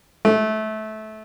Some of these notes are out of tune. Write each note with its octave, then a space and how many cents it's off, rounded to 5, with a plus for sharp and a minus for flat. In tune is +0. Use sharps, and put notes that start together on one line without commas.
A3 -20